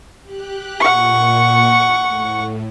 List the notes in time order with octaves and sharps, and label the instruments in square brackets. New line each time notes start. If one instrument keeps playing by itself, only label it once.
[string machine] G4 F#6
[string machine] A#2 [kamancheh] F#5 C#6
[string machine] A2